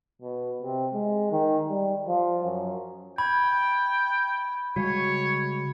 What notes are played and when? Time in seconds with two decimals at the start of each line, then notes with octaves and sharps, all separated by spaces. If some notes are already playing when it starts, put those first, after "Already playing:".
0.22 B2
0.62 C3
0.94 G#3
1.32 D#3
1.69 G3
2.08 F3
2.44 F#2
3.18 G5 B5 G#6
4.76 C#3 G3 G#3 F#4 C#5